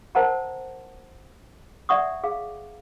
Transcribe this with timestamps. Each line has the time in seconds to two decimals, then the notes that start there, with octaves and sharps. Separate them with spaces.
0.15 A#4 C5 D#5 F#5 A5 A#5
1.89 D5 E5 F#5 C#6 D#6
2.24 G#4 F5